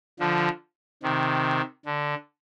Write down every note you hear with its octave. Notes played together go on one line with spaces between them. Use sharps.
D3 F3
C3 D#3
D3